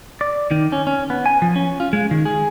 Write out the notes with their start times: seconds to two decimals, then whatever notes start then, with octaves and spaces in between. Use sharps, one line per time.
0.21 D5
0.51 D#3
0.72 C#4
0.87 C#4
1.10 B3
1.26 G#5
1.42 F3
1.56 C#4
1.80 F4
1.93 G#3
2.11 D#3
2.25 G#4